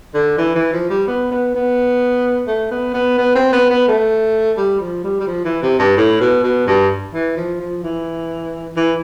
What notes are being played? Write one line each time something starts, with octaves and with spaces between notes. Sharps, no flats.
D3
E3
E3
F3
G3
B3
B3
B3
A3
B3
B3
B3
C4
B3
B3
A3
G3
F3
G3
G3
F3
E3
C3
G2
A2
B2
B2
G2
E3
F3
F3
E3
E3